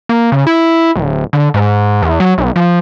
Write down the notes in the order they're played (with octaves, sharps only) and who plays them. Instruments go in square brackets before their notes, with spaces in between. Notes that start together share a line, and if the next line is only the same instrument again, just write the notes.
[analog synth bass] A#3
C#3
E4
D1
D3
G#2
E2
F#3
B1
F3